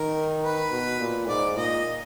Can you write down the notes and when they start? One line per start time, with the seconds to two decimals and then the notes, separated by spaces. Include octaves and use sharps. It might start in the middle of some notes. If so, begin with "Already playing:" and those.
Already playing: D#3 A#4
0.43 B4
0.71 B2
1.00 A#2
1.28 G#2 D5
1.57 A#2 D#5